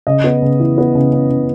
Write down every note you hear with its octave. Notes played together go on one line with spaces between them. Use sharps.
C#3 D#5
B3
C#3
E3
B3
C#3
C#3
C#3